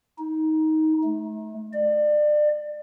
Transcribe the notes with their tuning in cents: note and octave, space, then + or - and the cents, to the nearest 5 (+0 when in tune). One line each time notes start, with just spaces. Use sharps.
D#4 +15
A3 -35
D5 +30